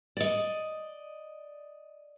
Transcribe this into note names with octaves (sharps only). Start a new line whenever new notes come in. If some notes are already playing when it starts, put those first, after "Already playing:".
D5 D#5